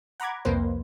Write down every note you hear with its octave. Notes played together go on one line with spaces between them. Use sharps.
F#5 A#5 B5 D6 G#6
C2 F2 A#3 B4 C5